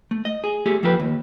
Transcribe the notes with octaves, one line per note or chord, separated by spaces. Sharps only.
A3
D#5
G#4
A3 G4 G#4
F2 F3 A3 G4 A#4 B4
D#2